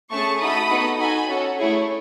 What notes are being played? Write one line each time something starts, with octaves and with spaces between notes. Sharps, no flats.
A3 C#4 G#4 A5 C#6
A3 D#4 F#4 A4 B5 D#6
B3 D#4 F#4 A4
D#4 F#4 A4 G#5 B5
C#4 F#4 A4 C#5
A3 E4 G#4 C#5